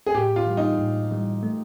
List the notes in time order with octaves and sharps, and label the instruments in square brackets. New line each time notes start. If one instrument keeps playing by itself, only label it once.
[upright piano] G#4
[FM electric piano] A2 [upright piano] G4
[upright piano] F4
[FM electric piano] E3 G3
[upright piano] D#4
[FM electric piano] A2
E3 G3
A3